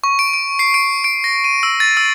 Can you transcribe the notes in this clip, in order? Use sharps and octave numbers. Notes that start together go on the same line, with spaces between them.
C#6
D7
D7
C7
D7
D7
A#6
D#7
E6
A6
E6